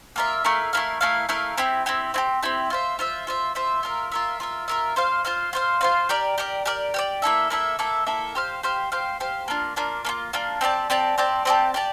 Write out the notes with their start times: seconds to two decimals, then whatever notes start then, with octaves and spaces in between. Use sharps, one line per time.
0.16 A#3 F4 A#4 E5
0.44 A3 E4 A#4 F5
0.73 A3 E4 A#4 F5
1.01 A3 E4 A#4 F5
1.29 A3 E4 A#4 F5
1.57 C4 E4 G4
1.86 C4 E4 G4
2.14 C4 E4 G4
2.43 C4 E4 G4
2.70 F4 C5 E5
2.99 F4 C5 E5
3.27 F4 C5 E5
3.55 F4 C5 E5
3.83 F4 A#4 E5
4.12 F4 A#4 E5
4.40 F4 A#4 E5
4.68 F4 A#4 E5
4.96 F4 C5 F5
5.25 F4 C5 F5
5.53 F4 C5 F5
5.81 F4 C5 F5
6.09 G4 A#4 D5
6.38 G4 A#4 D5
6.66 G4 A#4 D5
6.94 G4 A#4 D5
7.22 A#3 E4 A4 E5
7.50 A#3 E4 A4 E5
7.79 A#3 E4 A4 E5
8.06 A#3 E4 A4 E5
8.35 G4 C5 F5
8.63 G4 C5 F5
8.92 G4 C5 F5
9.20 G4 C5 F5
9.48 A#3 D4 F4
9.76 A#3 D4 F4
10.05 A#3 D4 F4
10.33 A#3 D4 F4
10.61 C4 G4 D5 A5
10.90 C4 G4 D5 A5
11.18 C4 G4 D5 A5
11.45 C4 G4 D5 A5
11.74 G4 D5 A5